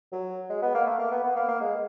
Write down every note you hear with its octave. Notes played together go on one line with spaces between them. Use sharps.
F#3
G#3
B3
A#3
A3
A#3
B3
B3
A#3
A#3
G#3